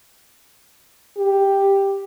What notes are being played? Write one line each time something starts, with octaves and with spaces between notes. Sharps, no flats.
G4